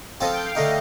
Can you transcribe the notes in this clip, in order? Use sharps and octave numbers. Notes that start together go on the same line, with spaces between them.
F3 C4 F4 A4 D#5
G5
F5
D3 A3 D#4 D#5